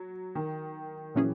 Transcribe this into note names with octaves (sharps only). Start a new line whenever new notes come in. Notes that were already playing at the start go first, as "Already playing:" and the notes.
Already playing: F#3
D#3
A#2 E3 F#3 C#4 G#4